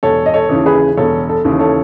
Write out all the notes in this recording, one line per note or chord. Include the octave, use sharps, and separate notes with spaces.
E1 A4 C#5
D#5
A4 C#5
D#2 C#3 E3
G#4 B4
E1 A4 C#5
A4
D#2 C#3 E3
A4 C#5